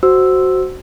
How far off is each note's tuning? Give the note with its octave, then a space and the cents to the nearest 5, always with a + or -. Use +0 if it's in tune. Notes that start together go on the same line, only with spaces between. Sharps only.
F#4 +10 C5 +0 E6 +0